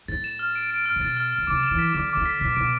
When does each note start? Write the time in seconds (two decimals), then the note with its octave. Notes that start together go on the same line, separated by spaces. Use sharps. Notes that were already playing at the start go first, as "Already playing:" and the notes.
0.08 A2 A6
0.24 E7
0.39 F6
0.55 D7
0.71 D7
0.86 F6
0.96 C3
1.01 B2 A6
1.17 F6
1.32 F6
1.38 B2
1.47 C3 D6
1.63 E7
1.71 E3
1.79 B6
1.94 D3 D6
2.10 D6
2.17 D3
2.26 B6
2.41 B2 B6
2.56 B2 D7